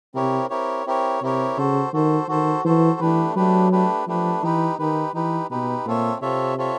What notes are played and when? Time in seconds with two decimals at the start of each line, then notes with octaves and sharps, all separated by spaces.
0.14 C3 C4 E4 G4 A#4 C#5
0.50 C4 E4 G4 A#4 C#5
0.86 C4 E4 G4 A#4 C#5
1.21 C3 C4 E4 G4 A#4 C#5
1.57 C#3 F#4 A4 C5
1.93 D#3 F#4 A4 C5
2.28 D#3 F#4 A4 C5
2.65 E3 F#4 A4 C5
3.00 E3 A3 D4 G4 B4
3.36 F#3 A3 D4 G4 B4
3.72 A3 D4 G4 B4
4.07 F3 A3 D4 G4 B4
4.43 E3 D#4 G4 B4
4.79 D#3 D#4 G4 B4
5.14 E3 D#4 G4 B4
5.50 B2 D#4 G4 B4
5.86 A#2 C4 F4 A4 C#5 E5
6.21 C3 C4 F4 A4 C#5 E5
6.58 C4 F4 A4 C#5 E5